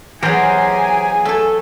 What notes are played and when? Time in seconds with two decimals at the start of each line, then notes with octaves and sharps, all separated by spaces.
0.23 E3 F#3 G4 G#4 A#4 C5 G#5
1.25 A3 A4